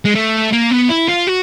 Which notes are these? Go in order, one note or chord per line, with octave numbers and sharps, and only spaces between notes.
G#3
A3
A#3
B3
E4
F4
F#4